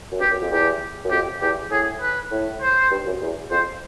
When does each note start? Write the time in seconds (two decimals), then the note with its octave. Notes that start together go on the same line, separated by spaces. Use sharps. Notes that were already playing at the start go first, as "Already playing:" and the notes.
0.12 F#2
0.21 G2 G4
0.31 F#2
0.41 F2
0.51 E2 G4
1.05 F#2
1.11 F2 G4
1.41 E2 G4
1.71 A2 G#4
2.01 B4
2.31 A2
2.62 C5
2.91 G2
3.06 F#2
3.21 E2
3.51 F2 C5